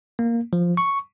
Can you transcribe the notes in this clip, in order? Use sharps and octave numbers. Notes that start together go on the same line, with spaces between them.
A#3
F3
C#6